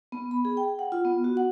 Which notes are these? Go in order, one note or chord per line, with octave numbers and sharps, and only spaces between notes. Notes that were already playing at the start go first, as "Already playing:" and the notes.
B3
B5
G#4
G5
F#5
F4
B3
F#4
F#5